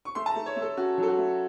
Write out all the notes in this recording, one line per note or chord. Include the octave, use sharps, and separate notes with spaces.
C#6
A3 C6
A5
A#5
A3
C#5
A3
A4
C#4 F#4
F#3 A4
F#4
A3